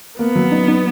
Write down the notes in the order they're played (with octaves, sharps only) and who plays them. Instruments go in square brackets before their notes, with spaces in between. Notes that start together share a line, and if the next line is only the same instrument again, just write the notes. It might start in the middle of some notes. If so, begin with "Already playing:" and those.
[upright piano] A#3 [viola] B3
[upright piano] F#3
D#4
D#4